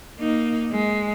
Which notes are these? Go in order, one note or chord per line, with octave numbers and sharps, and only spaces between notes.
A#3 D#4
G#3